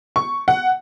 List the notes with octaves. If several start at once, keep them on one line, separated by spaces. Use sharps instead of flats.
C#6
F#5